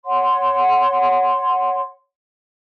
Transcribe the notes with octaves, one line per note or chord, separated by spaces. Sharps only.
C#5 F#5 C6